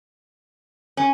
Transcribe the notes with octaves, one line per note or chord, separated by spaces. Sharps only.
C#4